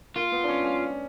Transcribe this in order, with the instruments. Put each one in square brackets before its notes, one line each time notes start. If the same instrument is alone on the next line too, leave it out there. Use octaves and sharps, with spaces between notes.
[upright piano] A#3 [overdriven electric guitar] F4
[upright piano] B3
D4
C#4
C#4